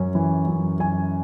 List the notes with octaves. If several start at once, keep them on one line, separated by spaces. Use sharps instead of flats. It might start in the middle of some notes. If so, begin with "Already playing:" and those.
Already playing: F#2 C#4
E3
F#2
F#2 G#5